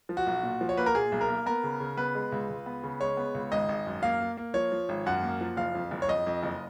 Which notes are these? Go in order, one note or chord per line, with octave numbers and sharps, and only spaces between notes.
F3
F#4
B1
A#2
F3
C#5
A#3 B4
A#4
A#2 G#4
B1
A#4
A#3
B3 A#4
C#3
C#3
B3 B4
G#3
C#2
C#2
B3
C#3
G#3 C#5
B3
C#2
G#1 D#5
G#1
F#2
A#3 F5
A#3
A#3
F3 C#5
F3
G#1
F#2 F#5
A#3
F3
F#1 F5
F2
F#1
C#5
F2 D#5
F2
F#1